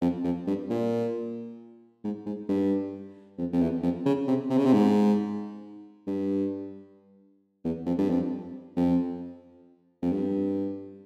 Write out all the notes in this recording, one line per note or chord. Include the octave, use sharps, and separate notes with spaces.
F2
F2
G2
A#2
G#2
G#2
G2
F2
F2
E2
F2
C#3
C3
C3
C#3
C3
G#2
G2
E2
F2
G2
F2
F2
F2
G2